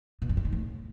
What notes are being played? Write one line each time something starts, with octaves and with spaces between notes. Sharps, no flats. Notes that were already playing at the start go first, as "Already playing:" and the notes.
B2
G2
E3
D#3
A2